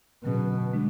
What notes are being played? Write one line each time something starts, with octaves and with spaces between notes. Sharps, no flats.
B2 D3 F#3 C#4 G#4
D3 G#3 D4